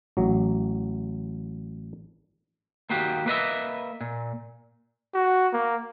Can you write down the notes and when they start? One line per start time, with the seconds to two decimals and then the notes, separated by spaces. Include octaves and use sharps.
0.17 A1 F#3
2.90 D#2 A#3 F#4 G4
3.26 A#3 B4 D#5 E5
4.01 A#2
5.14 F#4
5.53 A#3